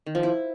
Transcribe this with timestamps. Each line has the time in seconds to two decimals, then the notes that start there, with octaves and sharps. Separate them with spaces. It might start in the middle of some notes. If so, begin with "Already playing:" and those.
0.06 D#3
0.15 F3
0.23 E4